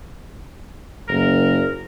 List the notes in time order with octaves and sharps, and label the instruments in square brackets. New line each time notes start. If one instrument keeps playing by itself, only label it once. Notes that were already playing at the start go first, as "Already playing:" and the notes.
[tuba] F#1 [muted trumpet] A#4